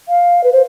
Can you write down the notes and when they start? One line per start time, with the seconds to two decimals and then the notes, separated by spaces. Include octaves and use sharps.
0.09 F5
0.44 B4
0.53 C5